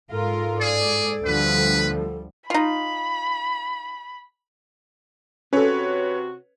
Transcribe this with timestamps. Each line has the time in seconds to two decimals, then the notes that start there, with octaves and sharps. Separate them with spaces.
0.11 G#2 F4 A4 A#4
0.61 G#4 D5
1.25 D2 D3 F3 G3 B4
2.50 D#4 F4 B5
5.53 C3 C#4 F#4 A4 B4 C#5